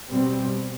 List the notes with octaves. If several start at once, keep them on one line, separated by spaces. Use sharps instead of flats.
B2 G3 C4